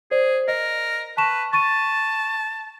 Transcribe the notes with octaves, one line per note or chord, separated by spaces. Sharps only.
G#4 C5 D5
A#4 D#5
B4 A5 C#6 E7
A5 C#6 A6 D#7